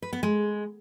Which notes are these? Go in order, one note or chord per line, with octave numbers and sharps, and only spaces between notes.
B4
B3
G#3